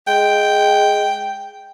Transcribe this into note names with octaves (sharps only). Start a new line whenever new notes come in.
G#3 G5